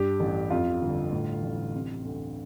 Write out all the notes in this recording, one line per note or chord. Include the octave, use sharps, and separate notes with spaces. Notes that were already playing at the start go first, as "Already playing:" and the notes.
Already playing: G2 G4
A1
F2 F4
G1
A2
A1
C3
D2